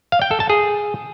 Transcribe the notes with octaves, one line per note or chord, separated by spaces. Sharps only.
F5
G5
A4
A5
G#4